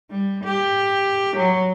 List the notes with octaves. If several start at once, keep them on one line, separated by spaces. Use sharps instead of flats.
G3
G4
F#3